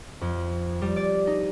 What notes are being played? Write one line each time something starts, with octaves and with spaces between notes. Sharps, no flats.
F2
G3
D5
D#4